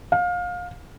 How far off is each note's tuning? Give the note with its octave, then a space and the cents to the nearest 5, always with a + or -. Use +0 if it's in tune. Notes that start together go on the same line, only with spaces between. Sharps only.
F5 +25